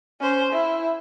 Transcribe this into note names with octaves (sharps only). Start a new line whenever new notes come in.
C#4 C5
E4